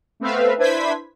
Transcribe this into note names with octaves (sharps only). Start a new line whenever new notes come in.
A3 B3 C4 B4 E5 F5
D4 E4 B4 C5 G#6 B6